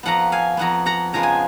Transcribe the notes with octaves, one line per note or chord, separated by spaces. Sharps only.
F2 F3 B3 F#5 A#5
F5 G#5
F2 F3 B3 F#5 A#5
F#5 A#5
C#3 F3 G#3 B3 A#5
G#5